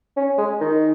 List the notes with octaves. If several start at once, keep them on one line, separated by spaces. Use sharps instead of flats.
C#4
G#3
D#3